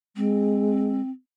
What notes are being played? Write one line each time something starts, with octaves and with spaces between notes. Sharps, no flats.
G#3 C4